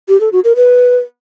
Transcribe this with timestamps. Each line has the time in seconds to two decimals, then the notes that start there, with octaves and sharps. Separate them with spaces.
0.09 G4
0.21 A4
0.32 F#4
0.44 A#4
0.56 B4